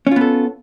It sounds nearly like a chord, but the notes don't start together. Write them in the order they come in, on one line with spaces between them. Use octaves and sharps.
C#4 F4 B3 A4